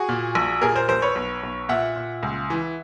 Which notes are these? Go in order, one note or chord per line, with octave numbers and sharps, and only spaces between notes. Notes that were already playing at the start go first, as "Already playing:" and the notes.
Already playing: F#4 G#4
A#2
A#1
A#2 G#4 A#4
A#4 C5
A#1 A#4 C5
B4 C#5
B1
B1
A#2 E5 F#5
A#2
C#2
E3